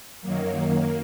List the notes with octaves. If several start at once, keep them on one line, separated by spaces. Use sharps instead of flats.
F#2 D#3 F#3 A#3